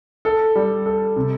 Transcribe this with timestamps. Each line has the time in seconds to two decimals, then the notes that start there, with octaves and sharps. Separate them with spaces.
0.25 A4
0.55 G3
0.86 A4
1.16 C3